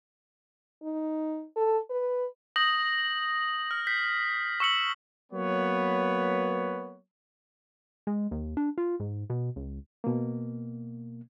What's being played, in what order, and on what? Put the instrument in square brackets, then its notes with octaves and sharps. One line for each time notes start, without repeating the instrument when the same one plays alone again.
[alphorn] D#4
A4
B4
[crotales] D#6 G6 A#6 F#7
F6
G6 B6 C7
C#6 E6 C#7 F#7
[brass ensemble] F#3 A#3 B3 B4 C#5
[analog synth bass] G#3
D#2
D4
F4
G#2
B2
C#2
[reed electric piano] B2 A#3